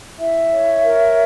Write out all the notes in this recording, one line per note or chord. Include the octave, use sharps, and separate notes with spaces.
E4 E5
C#5
A#4